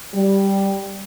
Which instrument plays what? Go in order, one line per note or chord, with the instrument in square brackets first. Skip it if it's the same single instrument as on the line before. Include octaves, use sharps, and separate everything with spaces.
[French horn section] G3